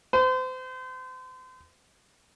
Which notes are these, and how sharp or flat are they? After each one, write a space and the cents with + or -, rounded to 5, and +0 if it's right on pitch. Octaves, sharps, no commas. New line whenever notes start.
C5 -35